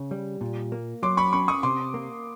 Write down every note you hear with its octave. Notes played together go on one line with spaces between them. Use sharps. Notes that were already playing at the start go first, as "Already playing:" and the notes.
Already playing: C#3
G3
A#2
A#3
F#3 C6 D6
B5 C#6
C#4 B5 C#6
C#6 D#6
C3 C6 D6
A#3